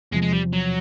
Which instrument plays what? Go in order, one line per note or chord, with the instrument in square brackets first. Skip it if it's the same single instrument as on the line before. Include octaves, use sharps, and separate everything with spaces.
[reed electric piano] E2 C3 F3 [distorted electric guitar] G#3
[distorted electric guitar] G#3
G3
F#3